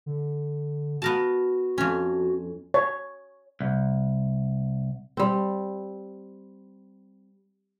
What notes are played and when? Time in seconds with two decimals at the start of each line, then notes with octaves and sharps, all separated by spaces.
0.06 D3
1.02 B3 F#4 A#4 A5
1.78 F2 C#4
2.74 C#5
3.60 C2
5.17 G3 C4